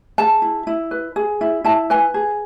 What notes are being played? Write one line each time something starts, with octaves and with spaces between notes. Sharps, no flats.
G#4 A5
E4
E4
B4
G#4
E4
E4 A5
B4 G#5
G#4